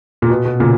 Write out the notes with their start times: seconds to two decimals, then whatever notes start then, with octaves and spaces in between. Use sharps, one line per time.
0.22 A#2
0.30 B2
0.45 B2
0.60 A#2 C#3